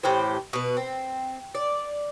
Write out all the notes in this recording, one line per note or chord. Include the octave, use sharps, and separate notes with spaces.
A2 E3 G4 C5
B2 B4
C4
D5